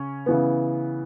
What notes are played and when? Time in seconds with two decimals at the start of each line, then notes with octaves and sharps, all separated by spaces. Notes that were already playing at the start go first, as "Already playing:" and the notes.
Already playing: C#3 C#4
0.26 C#3 E3 B3